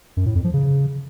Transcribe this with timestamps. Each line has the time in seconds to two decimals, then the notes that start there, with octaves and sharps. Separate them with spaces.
0.17 F#2
0.26 A2
0.35 F2
0.44 F3
0.54 C#3